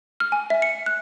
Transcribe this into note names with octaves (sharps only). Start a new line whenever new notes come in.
F6
G#5
E5
C#7
F#6